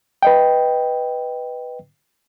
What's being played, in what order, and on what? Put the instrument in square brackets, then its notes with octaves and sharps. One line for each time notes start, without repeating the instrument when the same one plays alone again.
[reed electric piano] B4 D#5 G5